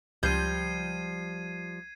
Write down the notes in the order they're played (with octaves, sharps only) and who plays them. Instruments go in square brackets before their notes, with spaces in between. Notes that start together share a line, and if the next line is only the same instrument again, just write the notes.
[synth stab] C#2 G6 [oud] F3 G3 [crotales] G#6 C7 D#7